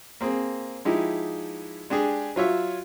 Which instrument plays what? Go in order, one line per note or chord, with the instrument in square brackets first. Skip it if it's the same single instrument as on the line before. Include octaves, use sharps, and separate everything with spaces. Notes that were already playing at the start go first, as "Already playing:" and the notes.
[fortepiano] A#3 C4 G#4
F3 G#3 D#4 E4 G4
G#3 D4 G4 G#4
F#3 F4 C#5 E5